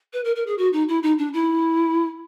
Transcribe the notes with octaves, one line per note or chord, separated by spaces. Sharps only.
B4
A#4
A#4
G#4
F#4
D#4
E4
D#4
D4
E4